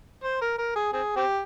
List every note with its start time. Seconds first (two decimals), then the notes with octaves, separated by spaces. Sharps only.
0.24 C5
0.42 A#4
0.58 A#4
0.76 G#4
0.93 C4 G#4
1.16 C4 G4